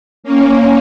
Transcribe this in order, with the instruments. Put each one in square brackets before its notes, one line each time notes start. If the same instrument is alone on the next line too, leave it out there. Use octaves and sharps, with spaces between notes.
[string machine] A#3 C#4